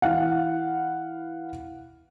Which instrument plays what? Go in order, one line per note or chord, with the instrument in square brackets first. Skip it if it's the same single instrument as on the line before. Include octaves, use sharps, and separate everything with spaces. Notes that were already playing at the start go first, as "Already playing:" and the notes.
[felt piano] E3 F5 F#5